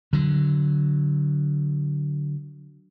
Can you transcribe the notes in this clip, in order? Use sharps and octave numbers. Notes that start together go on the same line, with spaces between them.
D3 F#3